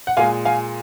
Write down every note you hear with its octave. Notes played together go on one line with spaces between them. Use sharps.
F#5
A#2 G#3 F5 G#5
F5 G#5